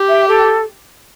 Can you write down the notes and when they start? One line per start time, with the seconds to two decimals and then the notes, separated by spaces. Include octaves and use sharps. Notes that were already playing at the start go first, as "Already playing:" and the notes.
Already playing: G4
0.08 E5
0.28 A4